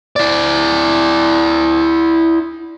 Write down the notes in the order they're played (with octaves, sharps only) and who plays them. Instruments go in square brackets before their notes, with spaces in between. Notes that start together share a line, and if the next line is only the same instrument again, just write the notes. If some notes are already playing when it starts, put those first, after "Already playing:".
[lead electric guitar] E4 D5